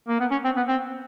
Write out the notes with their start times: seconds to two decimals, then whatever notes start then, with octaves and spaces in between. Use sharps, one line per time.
0.09 A#3
0.20 B3
0.32 C#4
0.45 C4
0.57 B3
0.68 C4